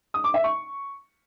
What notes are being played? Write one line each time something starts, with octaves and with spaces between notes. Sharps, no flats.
D#6
D6
E5
C#6